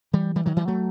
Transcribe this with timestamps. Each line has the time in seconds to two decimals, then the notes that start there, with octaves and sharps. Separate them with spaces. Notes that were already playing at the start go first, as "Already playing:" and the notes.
0.13 E3 G3
0.36 E3 G3
0.46 D#3 F#3
0.56 E3 G3
0.68 F#3 A3